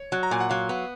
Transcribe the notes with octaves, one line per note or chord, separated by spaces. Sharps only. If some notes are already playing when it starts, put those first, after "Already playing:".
Already playing: C#5
F#3
A#5
A#2 G#5
F#5
F#3 F5
B3